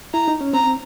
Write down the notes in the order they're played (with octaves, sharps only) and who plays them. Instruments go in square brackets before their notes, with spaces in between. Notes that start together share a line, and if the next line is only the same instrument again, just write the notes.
[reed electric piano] E4 [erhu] A#5
[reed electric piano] D#4
C#4
[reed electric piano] C4 [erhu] A#5